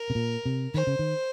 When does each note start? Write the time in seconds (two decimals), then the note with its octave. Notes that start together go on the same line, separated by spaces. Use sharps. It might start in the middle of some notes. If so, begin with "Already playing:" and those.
Already playing: A#4
0.10 C3
0.15 A#2
0.46 C3
0.74 D#3 C5
0.87 C#3
0.99 D#3